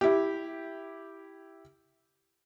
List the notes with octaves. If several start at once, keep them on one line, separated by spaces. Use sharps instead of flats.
E4 G4